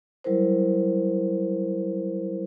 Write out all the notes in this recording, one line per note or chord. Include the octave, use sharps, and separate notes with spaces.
F#3 G3 E4 A#4 C5